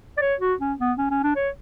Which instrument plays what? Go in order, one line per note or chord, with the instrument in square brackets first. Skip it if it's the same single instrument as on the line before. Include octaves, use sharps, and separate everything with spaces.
[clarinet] D5
C#5
F#4
C#4
B3
C#4
C#4
D4
C#5